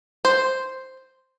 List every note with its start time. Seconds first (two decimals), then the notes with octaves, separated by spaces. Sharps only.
0.25 C5